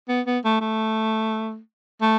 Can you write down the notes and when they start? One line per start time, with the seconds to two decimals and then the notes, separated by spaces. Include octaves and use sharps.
0.09 B3
0.27 B3
0.45 A3
0.61 A3
2.02 A3